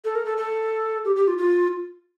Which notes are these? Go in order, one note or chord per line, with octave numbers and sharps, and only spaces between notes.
A4
A#4
A4
A4
G4
G4
F4
F4